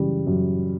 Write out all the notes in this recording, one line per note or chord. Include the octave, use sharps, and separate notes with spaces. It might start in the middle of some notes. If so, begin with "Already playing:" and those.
Already playing: F#2 C#3 E3 G3
F#2